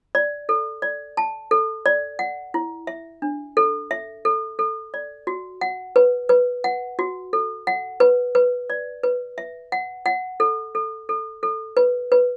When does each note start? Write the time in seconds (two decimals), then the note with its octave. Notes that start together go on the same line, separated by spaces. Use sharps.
0.15 D5
0.49 A4
0.82 D5
1.17 A5
1.51 A4
1.86 D5
2.19 F#5
2.54 E4
2.87 E5
3.22 D4
3.57 A4
3.91 E5
4.25 A4
4.59 A4
4.94 D5
5.27 F#4
5.61 F#5
5.96 B4
6.29 B4
6.64 F#5
6.99 F#4
7.33 A4
7.67 F#5
8.00 B4
8.35 B4
8.70 D5
9.03 B4
9.38 E5
9.72 F#5
10.06 F#5
10.40 A4
10.75 A4
11.09 A4
11.43 A4
11.77 B4
12.12 B4